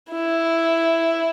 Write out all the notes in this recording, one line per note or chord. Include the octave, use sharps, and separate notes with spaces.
E4